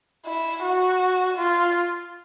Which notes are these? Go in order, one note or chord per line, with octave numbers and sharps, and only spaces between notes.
E4
F#4
F4